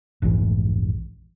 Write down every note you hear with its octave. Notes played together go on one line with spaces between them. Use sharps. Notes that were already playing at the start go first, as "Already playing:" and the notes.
F1 A#1 G#2 E3